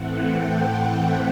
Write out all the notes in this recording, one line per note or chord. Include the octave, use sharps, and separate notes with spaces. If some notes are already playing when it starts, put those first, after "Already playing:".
Already playing: A2 E3 A3 C4 F#5
G5
F#5